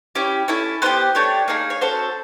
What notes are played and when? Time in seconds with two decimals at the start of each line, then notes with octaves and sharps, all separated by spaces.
0.15 C#4 E4 G4
0.48 C#4 E4 A4
0.82 B3 E4 G4 C5
1.15 A3 D4 G4 C#5
1.48 A#3 D#4 G#4
1.70 C#5
1.81 C#4 F#4 A4 C5